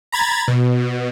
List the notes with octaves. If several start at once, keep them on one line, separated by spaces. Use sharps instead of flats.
A#5 B5 G#6 A6
B2